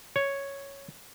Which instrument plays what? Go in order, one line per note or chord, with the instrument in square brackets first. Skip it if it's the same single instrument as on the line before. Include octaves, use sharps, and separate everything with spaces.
[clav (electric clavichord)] C#5